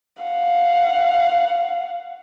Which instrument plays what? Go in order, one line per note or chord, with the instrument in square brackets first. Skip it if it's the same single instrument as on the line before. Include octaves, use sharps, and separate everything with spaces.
[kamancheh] F5 F#5